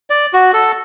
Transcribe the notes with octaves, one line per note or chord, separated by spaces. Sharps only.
D5
F#4
A4